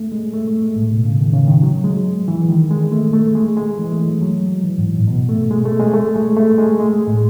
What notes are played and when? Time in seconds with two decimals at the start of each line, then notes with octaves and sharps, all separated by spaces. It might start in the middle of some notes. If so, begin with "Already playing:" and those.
Already playing: A3
0.12 G#3
0.33 A3
0.48 A3
0.63 G#3
0.76 A2
0.91 B2
1.05 C#3
1.19 D#3
1.34 C#3
1.48 D#3
1.62 F#3
1.84 G#3
2.28 E3
2.49 D#3
2.71 G#3
2.92 A3
3.13 A3
3.35 G#3
3.57 G#3
3.79 E3
3.92 A3
4.07 F#3
4.21 F#3
4.64 E3
4.78 G#2
4.92 A2
5.07 B2
5.29 A3
5.51 G#3
5.65 A3
5.80 G#3
5.94 A3
6.16 G#3
6.37 A3
6.58 G#3
6.80 G#3
6.93 G#3
7.08 A2